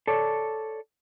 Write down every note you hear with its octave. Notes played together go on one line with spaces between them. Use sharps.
A4 C#5 D5